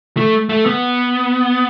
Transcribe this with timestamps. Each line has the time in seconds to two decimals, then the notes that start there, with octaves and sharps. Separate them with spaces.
0.17 A3
0.49 A3
0.66 B3